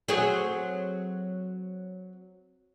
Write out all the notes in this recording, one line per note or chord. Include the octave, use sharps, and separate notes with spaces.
F#3 C4 G#4